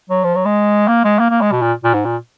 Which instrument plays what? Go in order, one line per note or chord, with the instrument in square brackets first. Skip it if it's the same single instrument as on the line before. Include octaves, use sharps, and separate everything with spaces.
[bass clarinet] F#3
F3
F#3
G#3
A#3
G#3
A#3
A#3
G#3
B2
A#2
A#2
G#2
A#2